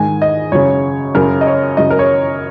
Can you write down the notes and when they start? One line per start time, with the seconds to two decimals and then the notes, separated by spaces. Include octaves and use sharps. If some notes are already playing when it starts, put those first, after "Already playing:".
Already playing: G#2 D#3 G#5
0.22 D#5
0.52 F#2 C#3 C#5
1.15 F#2 C#3 A#4
1.41 D#5
1.47 C#5
1.77 F#2 C#3 D#5
1.91 A#4
1.99 C#5